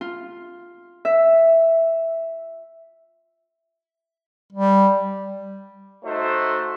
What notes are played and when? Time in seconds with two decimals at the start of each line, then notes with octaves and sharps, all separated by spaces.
0.01 F4
1.05 E5
4.53 G3
6.04 A3 D#4 F#4 C5